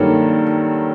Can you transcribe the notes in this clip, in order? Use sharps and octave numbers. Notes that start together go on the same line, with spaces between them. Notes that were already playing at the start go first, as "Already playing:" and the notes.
Already playing: G2 D#3 F#3 A#3 A4